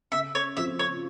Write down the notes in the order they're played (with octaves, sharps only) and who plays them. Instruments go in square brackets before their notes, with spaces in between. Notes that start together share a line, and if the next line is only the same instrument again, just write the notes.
[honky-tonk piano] C#3 [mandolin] E5
[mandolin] C#5
[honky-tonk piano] F3 C4 F4 [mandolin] E5
[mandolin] C#5